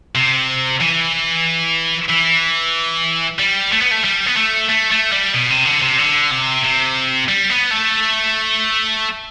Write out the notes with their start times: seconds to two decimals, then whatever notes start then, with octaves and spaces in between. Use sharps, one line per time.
0.15 C3
0.80 E3
2.10 E3
3.39 G3
3.72 A3
3.81 B3
3.91 A3
4.04 G3
4.26 B3
4.36 A3
4.69 A3
4.91 A3
5.12 G3
5.34 B2
5.51 C3
5.66 D3
5.82 C3
5.99 D3
6.31 C3
6.64 C3
7.28 G3
7.50 B3
7.71 A3